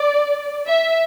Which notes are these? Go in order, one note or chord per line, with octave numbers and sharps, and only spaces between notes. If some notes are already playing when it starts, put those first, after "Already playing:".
Already playing: D5
E5